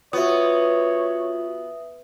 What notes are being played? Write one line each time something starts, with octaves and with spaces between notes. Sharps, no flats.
B3 F4 F#4 C#5 E5 D#6